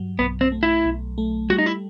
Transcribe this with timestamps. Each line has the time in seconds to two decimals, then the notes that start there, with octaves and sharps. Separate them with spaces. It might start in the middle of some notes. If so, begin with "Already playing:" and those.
Already playing: G2 F#3
0.19 B1 B3
0.41 C4
0.52 A3
0.63 E4
0.85 B1
1.18 A3
1.50 G3 F#4
1.58 D#4
1.66 E4